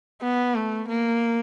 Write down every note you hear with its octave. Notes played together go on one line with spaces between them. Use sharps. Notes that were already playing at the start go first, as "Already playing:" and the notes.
B3
A3
A#3